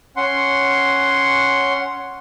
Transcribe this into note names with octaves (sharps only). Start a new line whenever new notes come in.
C#4 F#5 C6